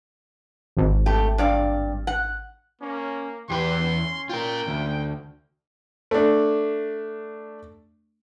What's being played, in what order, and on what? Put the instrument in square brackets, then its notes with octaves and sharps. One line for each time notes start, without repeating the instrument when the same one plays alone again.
[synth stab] G#1
[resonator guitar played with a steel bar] A3 G4
G2 D5 F5
F#5
[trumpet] A#3 [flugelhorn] C#4
[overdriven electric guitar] E2 B4 [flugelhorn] G4 [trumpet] C6
[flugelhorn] C#4
[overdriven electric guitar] F4 A#4 [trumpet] G5
[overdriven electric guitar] D2
[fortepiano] A3 D4